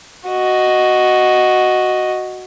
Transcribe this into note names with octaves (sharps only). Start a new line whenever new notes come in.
F#4 D#5